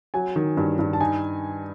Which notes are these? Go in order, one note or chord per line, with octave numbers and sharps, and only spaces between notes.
F#3 G#5
D#3
G2
G2
A5
D#4 G#5